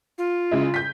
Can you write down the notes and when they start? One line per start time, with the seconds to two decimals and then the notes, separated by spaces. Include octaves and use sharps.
0.18 F4
0.52 C#3 G#3 E4
0.74 G6 B6